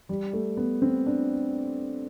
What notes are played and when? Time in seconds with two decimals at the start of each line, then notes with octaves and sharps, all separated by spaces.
0.09 G3
0.33 A3
0.57 B3
0.82 C4
1.06 D4